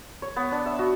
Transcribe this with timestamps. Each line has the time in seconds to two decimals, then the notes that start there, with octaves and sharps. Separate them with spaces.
0.22 C#5
0.36 B3
0.52 D4
0.66 E5
0.79 F#4